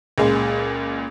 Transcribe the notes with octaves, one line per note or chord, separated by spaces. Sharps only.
C#2 A#2 G#3